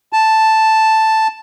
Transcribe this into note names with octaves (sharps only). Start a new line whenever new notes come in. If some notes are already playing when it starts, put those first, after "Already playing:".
A5